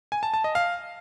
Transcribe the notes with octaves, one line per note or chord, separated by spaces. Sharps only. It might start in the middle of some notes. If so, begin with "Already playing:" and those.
G#5
A5
A5
D#5
F5